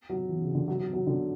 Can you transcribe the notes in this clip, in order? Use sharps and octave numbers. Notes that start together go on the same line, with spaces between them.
F#3
E3
C#3
D3
F#3
F#3
F#3
D3